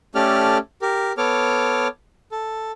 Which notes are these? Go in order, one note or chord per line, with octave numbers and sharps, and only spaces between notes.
A3 C#4 G4 A4 D5 F6
G4 A#4
B3 A4 C#5 D6 F6
A4